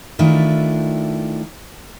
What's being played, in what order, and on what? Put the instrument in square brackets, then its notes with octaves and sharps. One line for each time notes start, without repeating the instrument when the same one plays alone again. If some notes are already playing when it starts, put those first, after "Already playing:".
[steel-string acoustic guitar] D#3 A3 D4 E4 F4